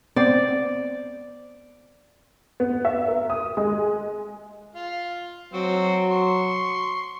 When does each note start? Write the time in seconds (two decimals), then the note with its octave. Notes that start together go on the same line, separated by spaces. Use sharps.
0.16 B3 C4 C5 D5
2.60 B3
2.85 E5
3.08 A#4
3.30 D#6
3.57 G#3
4.75 F4 F5
5.54 F#3 C4 F#4
6.11 C6 C#6